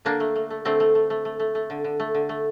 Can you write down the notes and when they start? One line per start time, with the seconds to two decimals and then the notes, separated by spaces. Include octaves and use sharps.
0.05 D3 A#3 D4
0.20 A3
0.35 A3
0.50 A3
0.65 D3 A3 C4
0.80 A3
0.95 A3
1.10 A3
1.25 A3
1.40 A3
1.55 A3
1.70 D3
1.84 D3
2.00 A3
2.14 D3
2.29 A3